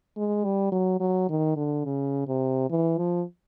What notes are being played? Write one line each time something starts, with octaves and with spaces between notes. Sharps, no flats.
G#3
G3
F#3
F#3
D#3
D3
C#3
C3
E3
F3